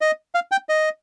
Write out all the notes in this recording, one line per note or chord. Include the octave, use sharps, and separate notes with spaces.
D#5
F5
G5
D#5